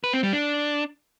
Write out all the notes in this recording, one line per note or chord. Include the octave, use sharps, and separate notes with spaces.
B4
C4
G3
D4